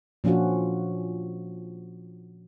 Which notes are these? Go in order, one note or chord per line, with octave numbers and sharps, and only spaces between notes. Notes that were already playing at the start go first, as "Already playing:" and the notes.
A#2 F3 C#4 D4 F4 F#4